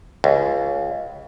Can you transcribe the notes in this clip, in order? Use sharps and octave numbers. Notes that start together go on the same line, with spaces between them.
C#2